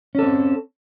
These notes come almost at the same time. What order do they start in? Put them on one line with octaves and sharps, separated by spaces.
C#4 A4 C4